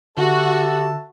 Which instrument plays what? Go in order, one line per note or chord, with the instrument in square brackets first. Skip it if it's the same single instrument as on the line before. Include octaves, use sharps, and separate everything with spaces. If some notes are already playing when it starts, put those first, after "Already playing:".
[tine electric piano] D3 [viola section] F#4 [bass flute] G4 [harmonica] A4 E5 A5